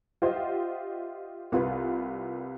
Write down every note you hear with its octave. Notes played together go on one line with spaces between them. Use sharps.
F4 G4 C5 D#5 E5 F#5
C2 F4 B4